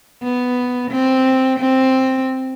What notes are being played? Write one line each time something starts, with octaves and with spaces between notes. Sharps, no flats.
B3
C4
C4